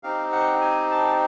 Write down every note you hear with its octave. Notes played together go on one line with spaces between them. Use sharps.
C4 D#4 G4 F5
F#5
G#5
A5